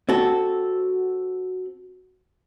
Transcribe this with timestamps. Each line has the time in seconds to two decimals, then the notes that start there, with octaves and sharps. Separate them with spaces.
0.09 C4 F#4 A4